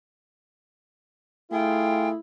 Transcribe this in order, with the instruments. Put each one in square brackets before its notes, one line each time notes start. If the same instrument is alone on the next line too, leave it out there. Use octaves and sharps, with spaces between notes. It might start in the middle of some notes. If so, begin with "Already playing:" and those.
[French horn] A3 [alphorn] E4 [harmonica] F4 G#4 [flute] G5